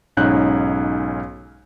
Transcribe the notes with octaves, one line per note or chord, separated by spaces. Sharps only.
B1 G#2 C#4 D#4 F#6 G6